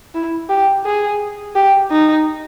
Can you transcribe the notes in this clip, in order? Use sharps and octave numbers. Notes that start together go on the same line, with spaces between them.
E4
G4
G#4
G4
D#4